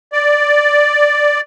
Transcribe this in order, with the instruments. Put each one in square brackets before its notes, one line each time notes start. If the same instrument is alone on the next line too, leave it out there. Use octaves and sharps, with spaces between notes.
[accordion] D5